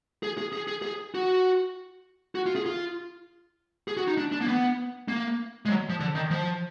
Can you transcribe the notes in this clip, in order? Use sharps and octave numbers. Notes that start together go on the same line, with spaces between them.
G#4
G#4
G#4
G#4
G#4
F#4
F#4
F4
G#4
F4
G#4
F#4
D#4
D4
D4
A#3
B3
A#3
G#3
F#3
F3
D3
D#3
F3